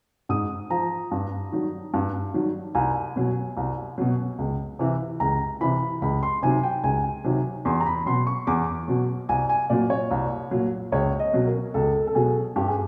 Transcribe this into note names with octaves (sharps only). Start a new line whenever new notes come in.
G#2 D#6
F3 A#5
G2
D#3 F#3
G2
D#3 F#3
C2 G#5
B2 F#3
C2
B2 F#3
C#2
C3 E3
C#2 A#5
C3 E3 B5
C#2 B5
C6
C3 D#3 F#3 G#5
G5
C#2 G#5
C3 D#3 F#3
E2 C6
A#5
B5
B2 F#3 C6
C#6
E2 D6
B2 F#3
C2 G#5
G#5
A#2 F#3 D5
C#5
C2
A#2 F#3
C#2 C#5
D#5
B2 F#3
A#4
C#2 A4
A4
B2 F#3 G#4
G2 G4
G#4